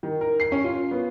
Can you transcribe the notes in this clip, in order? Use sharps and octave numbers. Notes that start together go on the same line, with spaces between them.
D#3
A#4
C7
C#4
F4
B3